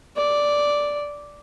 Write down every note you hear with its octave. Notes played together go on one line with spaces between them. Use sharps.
D5